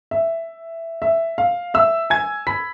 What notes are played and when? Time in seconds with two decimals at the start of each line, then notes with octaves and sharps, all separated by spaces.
0.11 E5
1.02 E5
1.38 F5
1.74 E5 E6
2.10 G#5 G#6
2.47 B5 B6